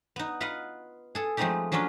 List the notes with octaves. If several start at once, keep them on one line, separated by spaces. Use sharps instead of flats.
B3 D#4
F4 B4 D#5 F5 F#5
G#4 A4
F3 G#3 A3 C4 D#4 G4
F3 F#3 C#4 D4 F4